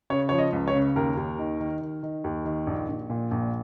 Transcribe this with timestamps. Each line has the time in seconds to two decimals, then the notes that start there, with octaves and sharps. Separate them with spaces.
0.10 C#3 C#5
0.29 F3 C#5
0.39 D#5
0.53 C#2
0.68 C#5
0.75 C#3
0.96 D#2 A#4
1.17 D#2
1.39 D#3
1.60 D#3
1.81 D#3
2.03 D#3
2.24 D#2
2.45 D#3
2.67 A#1
2.88 A#1
3.10 A#2
3.31 A#1